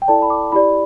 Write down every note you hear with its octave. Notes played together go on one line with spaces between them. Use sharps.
G5
E4 A4 D5 A5
B5
D6
E4 G4 D5 B5